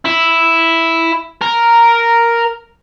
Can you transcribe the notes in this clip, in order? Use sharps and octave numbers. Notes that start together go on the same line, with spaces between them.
E4
A#4